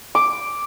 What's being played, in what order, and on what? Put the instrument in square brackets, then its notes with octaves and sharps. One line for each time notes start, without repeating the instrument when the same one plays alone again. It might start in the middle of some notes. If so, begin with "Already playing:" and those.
[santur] D6